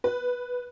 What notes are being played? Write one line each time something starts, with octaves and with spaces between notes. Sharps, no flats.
B4